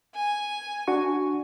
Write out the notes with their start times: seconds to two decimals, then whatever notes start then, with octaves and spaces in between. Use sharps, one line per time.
0.15 G#5
0.88 D4 F#4 C#6